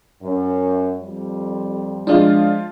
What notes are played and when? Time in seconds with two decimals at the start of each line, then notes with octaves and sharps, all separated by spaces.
0.23 F#2
1.01 F2 G3
2.07 F3 G#3 D4 F4